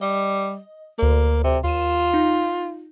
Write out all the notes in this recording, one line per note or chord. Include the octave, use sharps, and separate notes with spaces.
G3 D#5
D2 A#3 D5
C3
D#2 F4 D#7 E7
D#4